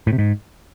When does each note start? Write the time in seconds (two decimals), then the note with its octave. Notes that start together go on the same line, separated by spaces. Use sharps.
0.07 A2
0.13 C3
0.18 G#2